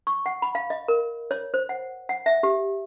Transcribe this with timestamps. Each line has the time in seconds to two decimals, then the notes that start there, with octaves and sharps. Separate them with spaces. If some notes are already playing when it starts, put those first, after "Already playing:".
0.07 C#6
0.26 F#5
0.42 B5
0.55 F5
0.70 D#5
0.88 A#4
1.31 C#5
1.54 C5
1.69 F#5
2.09 F#5
2.26 E5
2.43 G4